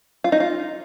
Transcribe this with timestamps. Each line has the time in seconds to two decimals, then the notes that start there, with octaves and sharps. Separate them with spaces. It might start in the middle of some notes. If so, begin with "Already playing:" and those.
0.24 F4
0.32 D#4
0.40 F4